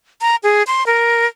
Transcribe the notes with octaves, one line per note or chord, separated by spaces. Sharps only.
A#5
G#4
C6
A#4